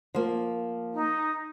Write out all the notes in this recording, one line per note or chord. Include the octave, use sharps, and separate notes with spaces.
F3 A#3
D#4